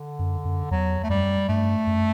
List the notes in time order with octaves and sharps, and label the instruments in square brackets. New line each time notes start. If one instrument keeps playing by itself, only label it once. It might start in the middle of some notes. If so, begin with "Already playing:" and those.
Already playing: [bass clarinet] D3
[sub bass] F#2
F#2
[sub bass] E2 [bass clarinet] F#3
[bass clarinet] A3
[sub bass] F#2 [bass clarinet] G3
[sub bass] G2 [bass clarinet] A3
[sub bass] F#2